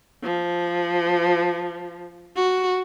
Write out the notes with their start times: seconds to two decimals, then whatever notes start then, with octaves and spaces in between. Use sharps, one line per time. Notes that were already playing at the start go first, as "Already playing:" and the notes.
0.23 F3
2.36 F#4